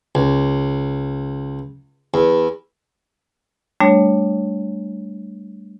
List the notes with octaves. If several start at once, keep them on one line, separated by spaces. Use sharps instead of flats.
C#2
E2
G3 A3 D4 C#5